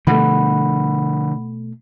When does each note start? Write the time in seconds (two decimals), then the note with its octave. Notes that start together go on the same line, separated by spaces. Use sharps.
0.07 B2 D3 F3 G3 A3 F#5 B5